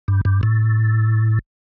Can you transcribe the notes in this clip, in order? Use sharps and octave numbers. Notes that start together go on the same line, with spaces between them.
G2
G2
A2